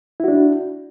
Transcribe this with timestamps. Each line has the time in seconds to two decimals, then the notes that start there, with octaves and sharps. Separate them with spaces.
0.20 E4
0.24 F#4
0.28 D4